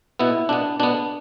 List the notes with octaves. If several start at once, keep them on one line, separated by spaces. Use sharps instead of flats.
B2 B3 E4
B2 B3 D4
B2 B3 D4